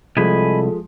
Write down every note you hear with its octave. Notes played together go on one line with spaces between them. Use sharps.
C2 F3 G#3 A4 D#5 G#5 B5